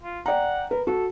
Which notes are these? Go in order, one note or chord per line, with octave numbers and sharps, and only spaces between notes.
F4
D5 F#5 G5 A#5
A#4 B4
F#4 A4